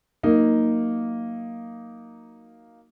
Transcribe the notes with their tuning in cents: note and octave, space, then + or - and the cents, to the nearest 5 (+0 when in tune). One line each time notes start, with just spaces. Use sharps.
F#3 -10 A#3 +0 D#4 +0